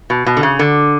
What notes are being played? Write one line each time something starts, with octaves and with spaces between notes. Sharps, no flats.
B2
B2
D3
C#3
D3